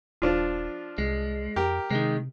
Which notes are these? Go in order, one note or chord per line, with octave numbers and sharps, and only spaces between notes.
D#1 F3 D4 F4
C2 G#3
F2 G4 A#4
C3 D#3 G#3